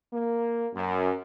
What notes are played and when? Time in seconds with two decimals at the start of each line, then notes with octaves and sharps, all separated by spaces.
0.13 A#3
0.74 F#2